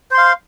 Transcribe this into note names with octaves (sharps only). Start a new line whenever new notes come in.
C5 F5 C6